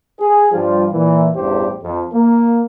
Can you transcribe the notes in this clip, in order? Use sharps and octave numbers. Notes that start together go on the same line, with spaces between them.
G#4
G2 F3 G3 F4
A#2 E3
A1 E2 G2 G4 C5
F2
A#3